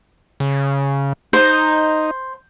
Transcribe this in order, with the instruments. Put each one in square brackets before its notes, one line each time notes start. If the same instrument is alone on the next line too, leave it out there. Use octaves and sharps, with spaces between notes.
[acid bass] C#3
[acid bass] D#4 [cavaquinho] C5